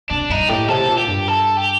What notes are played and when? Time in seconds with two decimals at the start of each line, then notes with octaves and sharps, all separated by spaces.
0.10 C3 D4
0.30 G2 D#4
0.49 A2 G4
0.68 C3 A4
0.88 A#2
0.98 G4
1.08 G2
1.28 A4
1.57 G4